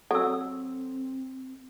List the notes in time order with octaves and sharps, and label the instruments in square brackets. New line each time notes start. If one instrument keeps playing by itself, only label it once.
[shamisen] F#3 [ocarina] C4 [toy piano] A4 E6